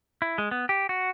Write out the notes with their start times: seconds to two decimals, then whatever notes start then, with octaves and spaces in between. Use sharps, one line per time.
0.22 E4
0.38 G#3
0.51 B3
0.69 G4
0.89 F#4